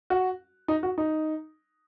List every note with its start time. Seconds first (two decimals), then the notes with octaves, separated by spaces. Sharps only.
0.10 F#4
0.68 D#4
0.83 F#4
0.98 D#4